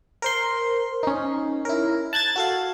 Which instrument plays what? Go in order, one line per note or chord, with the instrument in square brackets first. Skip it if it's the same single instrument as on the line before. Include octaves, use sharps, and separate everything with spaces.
[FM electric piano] A#4 C5 C6
C#4 D#4
E4 A#4
A5 F#6 G#6 A6
F#4 A4 F5